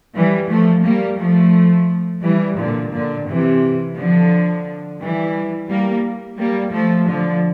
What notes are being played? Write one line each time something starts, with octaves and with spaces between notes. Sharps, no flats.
E3 G3
F3 A3
G3 A#3
F3 A3
E3 G3
A#2 D3
A#2 D3
C3 E3
D3 F3
E3 G3
G3 A#3
G3 A#3
F3 A3
D3 F3